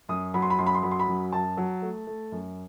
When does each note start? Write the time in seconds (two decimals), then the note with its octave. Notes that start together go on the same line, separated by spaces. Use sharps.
0.09 F#2 D#6
0.34 F#3 B5
0.42 C6
0.50 B5
0.58 F#2 C6
0.66 B5
0.75 C6
0.83 F#3 B5
0.91 C6
0.99 B5
1.08 F#2
1.32 F#2 A5
1.57 F#3
1.82 A3
2.07 A3
2.32 F#2